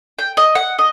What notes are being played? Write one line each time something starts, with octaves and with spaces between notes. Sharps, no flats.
G5
D#5
F#5
D#5